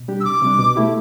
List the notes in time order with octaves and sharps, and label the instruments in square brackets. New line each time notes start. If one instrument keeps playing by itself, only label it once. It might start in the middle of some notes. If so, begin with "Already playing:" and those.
Already playing: [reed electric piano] B2
G3 D4 G4
[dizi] E6
[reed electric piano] C2 [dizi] D6
[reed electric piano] C3 G3 D4
B2
A3 E4 G4